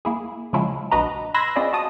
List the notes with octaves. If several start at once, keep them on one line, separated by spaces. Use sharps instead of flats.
A#3 E4 G#4
C#3 F3 F#3 G#3 E4 F4
A#1 D4 F#4 B4 D#5 A#5
B5 C6 E6 F#6 G#6 A#6
C4 C#4 F4 G#4 D5 D#5
F#4 A5 D#6